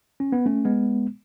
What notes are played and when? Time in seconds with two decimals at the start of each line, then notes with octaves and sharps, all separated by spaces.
0.20 C#4
0.32 B3
0.46 A3 C#4
0.65 G#3 B3